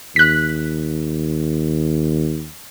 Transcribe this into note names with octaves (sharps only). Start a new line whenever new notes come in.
D#2 F#6 B6